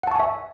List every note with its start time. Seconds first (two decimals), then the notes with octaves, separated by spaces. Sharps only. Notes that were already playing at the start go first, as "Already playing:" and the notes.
0.03 F#5
0.07 A5
0.11 C#6
0.16 G#5
0.20 E5